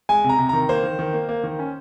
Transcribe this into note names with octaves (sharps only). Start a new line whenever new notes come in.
G#3 G#5
C3
A#5
C3
D#3 A#5
A#3 C5
D#3
D#3
A#3
A#3
D#3
C#4